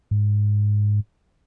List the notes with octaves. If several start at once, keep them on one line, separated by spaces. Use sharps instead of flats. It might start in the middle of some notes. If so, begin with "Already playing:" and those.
G#2